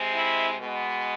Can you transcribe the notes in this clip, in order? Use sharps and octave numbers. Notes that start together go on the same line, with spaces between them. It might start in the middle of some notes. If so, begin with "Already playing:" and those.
Already playing: C3 G#3 C4
E4
B2 G#3 B3